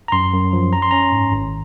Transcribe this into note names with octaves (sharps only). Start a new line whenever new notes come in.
A#5
F#2 C6
F#2
F3
C#4 A#5
C6
C#4 A#5
G#2
G#1